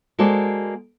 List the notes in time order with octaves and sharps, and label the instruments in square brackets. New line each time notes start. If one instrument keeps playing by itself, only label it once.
[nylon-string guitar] G#3 A#3 F#4 A4 C5 D5